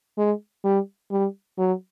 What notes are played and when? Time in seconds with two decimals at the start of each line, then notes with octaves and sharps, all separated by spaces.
0.18 G#3
0.64 G3
1.11 G3
1.58 F#3